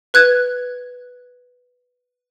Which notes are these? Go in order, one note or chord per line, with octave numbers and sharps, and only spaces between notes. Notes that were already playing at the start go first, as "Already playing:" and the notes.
B4 F#6 G#6